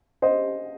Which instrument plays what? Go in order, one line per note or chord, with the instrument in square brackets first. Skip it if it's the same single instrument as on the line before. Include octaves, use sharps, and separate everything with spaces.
[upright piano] C5 D#5